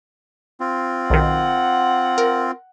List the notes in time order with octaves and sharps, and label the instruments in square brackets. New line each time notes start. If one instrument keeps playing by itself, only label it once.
[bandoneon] C4 F4
[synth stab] B1 D#3 [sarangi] F#5
[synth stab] A#4